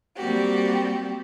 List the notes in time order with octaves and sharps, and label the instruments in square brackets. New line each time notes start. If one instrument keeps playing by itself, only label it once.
[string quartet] G3 A#3 C4 F#4 G4